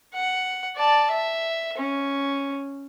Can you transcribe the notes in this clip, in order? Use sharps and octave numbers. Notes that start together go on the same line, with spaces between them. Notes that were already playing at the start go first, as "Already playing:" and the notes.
F#5
D5 A5
E5
C#4